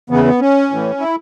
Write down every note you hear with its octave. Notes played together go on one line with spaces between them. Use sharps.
E2 C#3 E3 B3
B3
C#4
A2 E3
E4